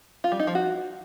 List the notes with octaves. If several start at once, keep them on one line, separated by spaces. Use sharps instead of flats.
F4
G3
D#4
F3
F#4